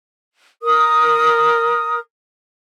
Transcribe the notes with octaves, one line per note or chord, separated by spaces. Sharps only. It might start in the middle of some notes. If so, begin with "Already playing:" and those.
A#4 D#6